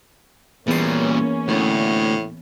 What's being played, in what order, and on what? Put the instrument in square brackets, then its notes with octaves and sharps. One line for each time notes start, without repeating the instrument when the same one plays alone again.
[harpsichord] E2 C6 [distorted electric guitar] A#2 G3 [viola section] A#3 C#4
[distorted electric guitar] D2 [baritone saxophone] A2